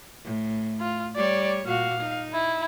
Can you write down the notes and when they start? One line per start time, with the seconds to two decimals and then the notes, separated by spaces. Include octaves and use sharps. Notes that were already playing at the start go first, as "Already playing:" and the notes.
0.24 A2
0.80 F4
1.16 G3 C#5 D5
1.66 A#2 F#4 F5
2.01 D#4
2.33 E4